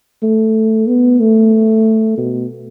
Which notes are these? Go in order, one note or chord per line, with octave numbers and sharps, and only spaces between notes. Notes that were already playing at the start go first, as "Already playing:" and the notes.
A3
B3
A3
B2